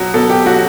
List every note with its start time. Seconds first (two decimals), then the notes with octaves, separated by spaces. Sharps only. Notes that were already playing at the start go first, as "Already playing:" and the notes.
Already playing: B2 F#3
0.14 B2 A4
0.30 G4
0.46 F#3 F#4